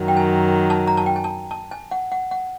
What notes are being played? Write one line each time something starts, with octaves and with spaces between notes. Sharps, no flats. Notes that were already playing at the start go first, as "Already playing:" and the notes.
Already playing: F#2 D#3 F#3
G5
G#5
A5
A#5
A5
G5
G#5
A5
A5
G#5
F#5
F#5
F#5